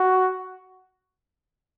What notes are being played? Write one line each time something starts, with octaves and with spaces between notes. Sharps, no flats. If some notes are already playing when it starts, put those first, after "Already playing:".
Already playing: F#4